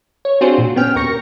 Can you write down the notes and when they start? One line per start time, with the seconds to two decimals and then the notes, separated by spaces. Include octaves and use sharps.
0.25 C#5
0.41 C4 D4 F4 F#4 G#4 C5
0.58 A#2
0.76 B3 C#4 G5 F6
0.95 D#2 A#4 C#6 A#6 C#7